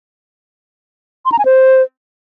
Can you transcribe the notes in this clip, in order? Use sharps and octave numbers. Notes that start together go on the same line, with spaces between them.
C6
A#5
G#5
C5